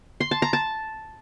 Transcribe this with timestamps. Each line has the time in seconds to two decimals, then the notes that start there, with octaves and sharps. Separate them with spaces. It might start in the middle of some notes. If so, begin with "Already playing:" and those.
0.20 C6
0.31 A5
0.42 A#5
0.53 A5